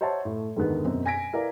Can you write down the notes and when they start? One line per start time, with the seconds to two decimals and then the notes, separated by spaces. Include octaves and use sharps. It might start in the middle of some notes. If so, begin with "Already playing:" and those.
0.01 C5 C#5 E5 F#5 A5 C6
0.25 A2
0.56 E2 G#2 D3 D#3 B3
0.85 F#2 B2 C4
1.06 G#5 G#6 A#6 B6 D7
1.33 E4 A#4 B4 D5 F5